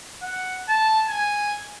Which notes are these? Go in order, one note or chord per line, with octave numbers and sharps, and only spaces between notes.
F#5
A5
G#5